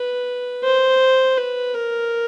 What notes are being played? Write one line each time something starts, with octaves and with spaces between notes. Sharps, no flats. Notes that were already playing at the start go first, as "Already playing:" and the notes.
Already playing: B4
C5
B4
A#4